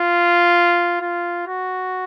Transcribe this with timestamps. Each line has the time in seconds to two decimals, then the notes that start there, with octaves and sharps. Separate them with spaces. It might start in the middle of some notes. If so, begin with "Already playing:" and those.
Already playing: F4
1.01 F4
1.47 F#4